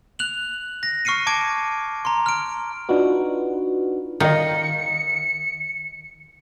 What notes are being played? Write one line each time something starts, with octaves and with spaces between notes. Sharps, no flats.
F#6 F7 F#7
A#6
C#6 F6 C7 C#7 D#7
A5 D6 G#6 D7
A#5 C6
F6 D7
D4 D#4 F4 F#4 B4
D#3 D#5 F5 C#7